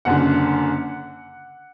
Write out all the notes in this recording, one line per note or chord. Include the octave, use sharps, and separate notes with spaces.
F#1 F#2 D3 F#5